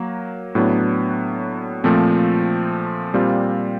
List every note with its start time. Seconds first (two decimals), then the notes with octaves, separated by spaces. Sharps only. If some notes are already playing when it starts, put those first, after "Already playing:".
Already playing: F#3 A#3
0.55 A2 F#3 B3 D4
1.84 A#2 F3 A3 C4
3.14 A#2 G3 C4 F4